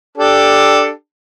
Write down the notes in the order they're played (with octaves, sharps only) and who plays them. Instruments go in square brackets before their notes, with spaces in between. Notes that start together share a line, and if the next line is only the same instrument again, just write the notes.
[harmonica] D4 G4 A4